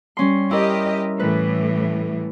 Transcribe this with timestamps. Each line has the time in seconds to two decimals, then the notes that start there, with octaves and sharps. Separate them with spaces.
0.17 G3 C#4 C6
0.51 E4 G4 A#4 D#5
1.20 A2 E3 B4